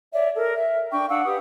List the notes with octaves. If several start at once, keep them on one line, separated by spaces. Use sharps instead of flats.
C#5 D5 E5
A4 A#4
E5
D4 G5 C#6
D4 F5 F#5 E6
G4 B4 D#6